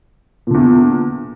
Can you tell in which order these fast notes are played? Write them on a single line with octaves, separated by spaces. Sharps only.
A#2 D3 E2